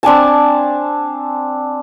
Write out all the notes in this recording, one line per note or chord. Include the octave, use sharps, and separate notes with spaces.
C4 D4 G#5 A5